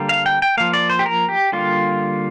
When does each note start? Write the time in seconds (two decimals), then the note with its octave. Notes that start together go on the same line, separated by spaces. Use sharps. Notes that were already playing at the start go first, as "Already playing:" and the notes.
Already playing: D3 G3 A#3
0.09 F5
0.26 G5
0.42 G5
0.57 F3 A#3 F5
0.73 D5
0.90 C5
0.99 G4
1.06 A#4
1.29 G4
1.52 D3 G3 A#3 F4